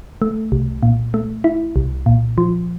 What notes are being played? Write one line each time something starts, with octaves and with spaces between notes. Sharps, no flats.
A3
C2
A#2
A3
E4
C2
A#2
F3